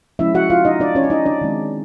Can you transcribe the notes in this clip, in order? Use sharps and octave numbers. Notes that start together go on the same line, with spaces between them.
F3 G#3 C#4 E4 E5
F#4 F#5
F4 F5
D#4 D#5
D4 D5
C#4 C#5
D5
D#4 D#5
D4 D5
D#3 G#3 C4